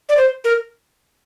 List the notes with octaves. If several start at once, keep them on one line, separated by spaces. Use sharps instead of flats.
D5
C5
A#4